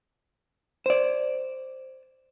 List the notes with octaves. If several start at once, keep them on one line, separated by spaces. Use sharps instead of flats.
C5 D5